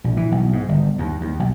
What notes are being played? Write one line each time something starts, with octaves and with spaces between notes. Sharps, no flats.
A#1
E3
B1
G#2
G1
D#2
D#2
B1